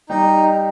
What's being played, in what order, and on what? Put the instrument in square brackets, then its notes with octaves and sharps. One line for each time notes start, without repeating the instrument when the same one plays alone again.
[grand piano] G3 G4 [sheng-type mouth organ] D#4